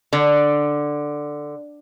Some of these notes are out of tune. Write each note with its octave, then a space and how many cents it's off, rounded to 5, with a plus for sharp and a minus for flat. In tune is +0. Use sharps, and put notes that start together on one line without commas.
D3 +5